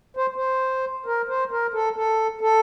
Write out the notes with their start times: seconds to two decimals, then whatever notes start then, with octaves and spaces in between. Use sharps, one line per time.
0.17 C5
0.36 C5
1.06 A#4
1.28 C5
1.51 A#4
1.74 A4
1.96 A4
2.41 A4